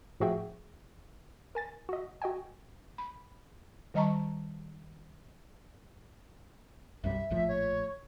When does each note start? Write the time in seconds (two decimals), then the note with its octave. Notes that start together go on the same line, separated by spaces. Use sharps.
0.20 A2 F3 F#4 G#4 E5 G5
1.55 A#4 G#5 A6
1.89 F#4 D#5
2.22 F#4 D#5 G5 G#5
2.98 B5
3.94 D#3 G3 D#5 A5 A#5 C#6
7.04 B1 F#2 G3 E5
7.30 A#1 A2 F3
7.48 C#5